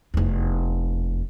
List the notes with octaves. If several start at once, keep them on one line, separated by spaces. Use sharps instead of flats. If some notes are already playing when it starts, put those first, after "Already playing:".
F1 E2